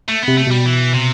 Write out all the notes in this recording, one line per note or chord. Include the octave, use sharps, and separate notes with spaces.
A3
C3 B3
A3
B2 G3
E3
C3